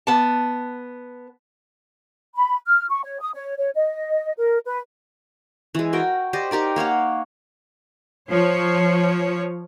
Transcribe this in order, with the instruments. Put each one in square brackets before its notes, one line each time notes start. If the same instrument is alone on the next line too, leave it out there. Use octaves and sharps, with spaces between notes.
[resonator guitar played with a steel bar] B3 A5
[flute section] B5
F6
C#6
C#5
D#6
C#5
C#5
D#5
A#4
B4
[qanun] E3 G#3
F#4 A#4 G5
G4 C5 D5 D#5
D#4 G4 A#4 D5
A#3 C#5 F5 F#5
[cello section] F3 C#5